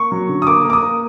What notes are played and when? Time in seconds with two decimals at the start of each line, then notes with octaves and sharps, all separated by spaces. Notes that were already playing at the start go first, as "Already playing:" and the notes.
Already playing: A#3 C#6
0.12 F#3
0.29 D3
0.42 D#6
0.47 A#3 D6
0.65 A#3
0.70 D6
0.73 D#6
0.82 A#3